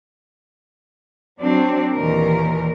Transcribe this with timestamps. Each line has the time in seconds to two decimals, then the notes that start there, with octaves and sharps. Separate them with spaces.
1.39 F#3 C4 D4
1.93 D#2 A#2 E3 A#4